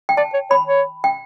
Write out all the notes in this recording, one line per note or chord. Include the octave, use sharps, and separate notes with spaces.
G5
D5 A5
C#5
C#5 B5
C#5
G5